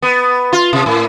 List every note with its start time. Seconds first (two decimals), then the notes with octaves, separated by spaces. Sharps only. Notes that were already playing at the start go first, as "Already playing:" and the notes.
0.02 B3
0.53 F4
0.73 C3
0.86 A2